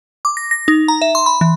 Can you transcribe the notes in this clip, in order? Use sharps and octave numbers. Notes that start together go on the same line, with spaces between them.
D6
A#6
A#6
D#4
A#5
E5
C6
B5
E3